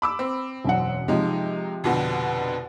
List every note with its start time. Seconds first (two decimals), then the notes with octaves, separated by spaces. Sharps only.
0.02 B5 D6 E6
0.19 C4
0.65 E1 F#2 F#5
1.08 C3 F3 G#3 D#4
1.84 F2 B2 D3